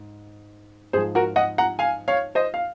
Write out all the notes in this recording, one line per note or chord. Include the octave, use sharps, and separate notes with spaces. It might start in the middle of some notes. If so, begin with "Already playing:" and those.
Already playing: G#2
G#2 F3 G#4 C5
F#4 A#4
D#5 F#5
F#5 A#5
F5 G#5
C#5 F5
C5 D#5
F5